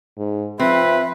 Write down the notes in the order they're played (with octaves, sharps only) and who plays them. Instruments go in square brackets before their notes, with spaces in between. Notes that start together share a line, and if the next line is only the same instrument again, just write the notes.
[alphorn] G#2
[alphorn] F3 [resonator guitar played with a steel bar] C4 [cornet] B4 [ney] E5